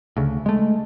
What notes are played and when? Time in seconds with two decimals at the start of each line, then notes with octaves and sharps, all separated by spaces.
0.17 D2 C#3
0.46 G#3 A3